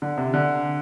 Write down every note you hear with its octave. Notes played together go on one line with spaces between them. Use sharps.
D3
C3
D3